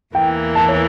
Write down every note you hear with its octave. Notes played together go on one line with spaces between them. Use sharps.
E2 E3 A#3 G5
A5
C#5